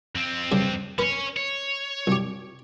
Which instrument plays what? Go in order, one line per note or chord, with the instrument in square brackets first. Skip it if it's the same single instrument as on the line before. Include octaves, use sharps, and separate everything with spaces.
[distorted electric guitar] F2 C4
[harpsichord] G2 C#3
[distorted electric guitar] C#4 C#5 [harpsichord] B4
[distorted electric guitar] C#5
[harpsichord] C2 G4